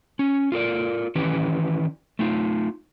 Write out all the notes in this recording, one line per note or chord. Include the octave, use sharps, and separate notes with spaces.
C#4
F4 A4 A#4 D5
D#3 E3 C#4 E4 G4 B4
A3 D#4 F4